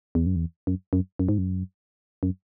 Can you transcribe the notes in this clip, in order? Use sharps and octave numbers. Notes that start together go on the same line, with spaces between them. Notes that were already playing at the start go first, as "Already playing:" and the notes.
E2
F#2
E2
F#2
F#2
F#2
G#2
F#2
F#2